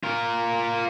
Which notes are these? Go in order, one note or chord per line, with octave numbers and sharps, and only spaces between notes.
F4 A#4